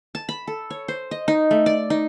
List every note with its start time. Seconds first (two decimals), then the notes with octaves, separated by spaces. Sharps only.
0.15 A5
0.29 B5
0.48 A4
0.70 C#5
0.88 C5
1.11 D#5
1.28 D#4
1.51 A3
1.66 D5
1.90 D#4